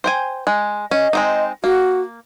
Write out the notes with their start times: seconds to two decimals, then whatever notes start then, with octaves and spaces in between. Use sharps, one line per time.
0.04 C5 G5 G#5
0.47 G#3
0.91 C#4 D#5
1.13 G#3 C4 D#4
1.64 A#3 F#4